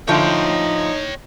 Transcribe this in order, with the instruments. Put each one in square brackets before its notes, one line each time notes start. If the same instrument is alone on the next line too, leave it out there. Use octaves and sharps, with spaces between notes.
[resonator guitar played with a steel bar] A2 D3 F3 [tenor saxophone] D#4 [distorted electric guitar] C#5 G5